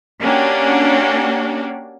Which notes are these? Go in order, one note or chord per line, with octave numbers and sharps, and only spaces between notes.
A#3 C#4 D4 F#4 G4